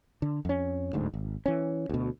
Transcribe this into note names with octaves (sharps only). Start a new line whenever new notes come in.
D3
F2 C#4
D1 D2 G#2
G#1
E3 C#4
D2 B2